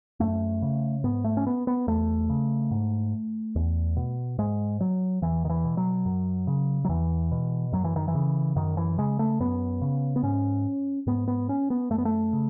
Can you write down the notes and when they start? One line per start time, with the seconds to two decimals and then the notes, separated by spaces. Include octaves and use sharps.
0.20 F#2 A3
0.62 C#3
1.04 G#2 B3
1.24 A3
1.37 C#4
1.47 B3
1.67 B3
1.87 E2 A3
2.30 C#3
2.71 G#2
3.56 E2
3.96 B2
4.38 G#2 G#3
4.81 F#3
5.22 E2 E3
5.45 D#3
5.49 E3
5.64 B2
5.77 F#3
6.06 F#2
6.47 C#3
6.85 F#3
6.89 E2 E3
7.32 B2
7.72 F#2 F#3
7.84 E3
7.96 D#3
8.08 E3
8.15 C#3
8.56 F#2 D#3
8.77 E3
8.98 C#3 G#3
9.19 A3
9.40 F#2 B3
9.82 C#3
10.16 B3
10.23 G#2 C#4
11.07 G#2 B3
11.28 B3
11.49 C#4
11.70 B3
11.90 F#2 A3
11.98 B3
12.05 A3
12.33 C#3